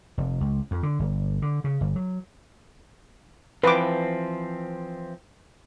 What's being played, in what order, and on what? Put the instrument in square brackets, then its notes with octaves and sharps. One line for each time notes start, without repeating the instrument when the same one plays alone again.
[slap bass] F1
C#2
F2
D3
G1
D3
C#3
G1
F#3
[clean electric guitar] E3 F3 C4 [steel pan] B4 D6